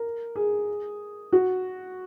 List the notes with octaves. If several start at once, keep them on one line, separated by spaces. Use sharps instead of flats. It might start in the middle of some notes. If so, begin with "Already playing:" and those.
Already playing: A#4
G#4
F#4